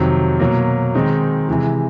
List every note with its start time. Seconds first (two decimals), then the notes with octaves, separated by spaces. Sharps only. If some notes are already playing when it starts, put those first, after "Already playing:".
Already playing: F2 C3 D#3 F#3
0.40 B2 F#3 A#3
0.95 D#3 G#3 C4 D#4
1.49 C3 E3 G#3